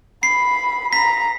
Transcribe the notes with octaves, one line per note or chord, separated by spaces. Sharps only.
B5 C7
A#5 B6